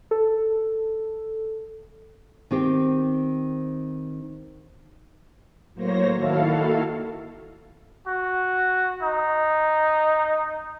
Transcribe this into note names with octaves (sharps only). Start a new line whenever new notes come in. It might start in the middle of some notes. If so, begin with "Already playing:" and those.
A4
D#3 C4 G4
A2 F#3 A#3 C5 C#5 A#6
D#3 A#3 E4 F#4 A4 F5
F#4
D#4